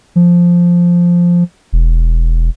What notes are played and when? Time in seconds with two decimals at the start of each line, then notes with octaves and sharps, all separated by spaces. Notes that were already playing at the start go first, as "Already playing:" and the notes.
0.16 F3
1.73 E1